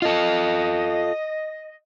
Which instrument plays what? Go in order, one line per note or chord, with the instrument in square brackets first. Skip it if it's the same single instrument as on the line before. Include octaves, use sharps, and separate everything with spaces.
[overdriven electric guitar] F4 A4 [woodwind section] D#5